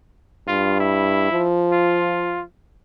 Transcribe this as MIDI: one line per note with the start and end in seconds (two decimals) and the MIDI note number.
0.48 1.31 43
0.48 0.75 65
0.80 1.46 64
1.32 2.46 53
1.72 2.42 65